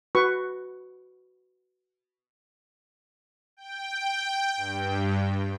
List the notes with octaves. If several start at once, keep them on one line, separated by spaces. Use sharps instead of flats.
F#4 B4 C#6
G5
G2